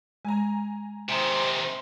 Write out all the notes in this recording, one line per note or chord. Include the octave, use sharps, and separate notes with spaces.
G#3 G#5 A#5
C3 D#3 C5 G#5 A#5 G6